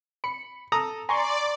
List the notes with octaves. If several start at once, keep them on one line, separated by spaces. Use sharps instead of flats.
B5 C#7
A4 A#5 D#6
D5 G#5 A#5 C6 C#6